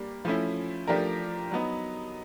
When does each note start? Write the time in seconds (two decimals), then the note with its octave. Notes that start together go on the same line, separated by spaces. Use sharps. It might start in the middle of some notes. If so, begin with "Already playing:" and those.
Already playing: G3 A#3 D4
0.25 F3 A3 C#4 E4
0.87 F3 A3 D4 G4 A#4
1.51 F#3 B3 D#4